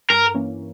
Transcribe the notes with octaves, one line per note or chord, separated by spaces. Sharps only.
G2 A#4
E3 A#3 C#4